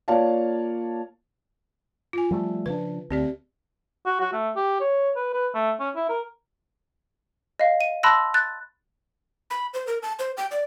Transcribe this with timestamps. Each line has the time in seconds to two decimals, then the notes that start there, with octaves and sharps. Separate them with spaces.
0.08 A#3 F4 C#5 D5 F5 A5
2.13 F4 G#5
2.31 F3 G3 A3
2.66 C#3 F3 D4 B4
3.11 D2 C4 G4 D5
4.06 F#4
4.20 F#4
4.33 A3
4.56 G4
4.80 C#5
5.16 B4
5.33 B4
5.54 A3
5.80 C#4
5.96 E4
6.09 A#4
7.60 D#5 F5
7.81 D#7
8.03 A5 B5 C6 E6 F#6 A#6
8.34 F#6 A6
9.50 B5
9.74 C5
9.87 A#4
10.03 A5
10.19 C5
10.37 G5
10.51 D5